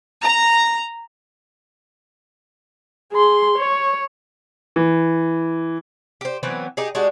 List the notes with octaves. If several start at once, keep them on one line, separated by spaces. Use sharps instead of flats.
A#5
G#4 C6
C#5
E3
G4 C5
E3 F#3 B3 C4
D#4 G4 G#4
G#3 D4 F#4 G4